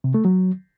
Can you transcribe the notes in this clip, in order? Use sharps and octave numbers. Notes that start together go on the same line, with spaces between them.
C3
A3
F#3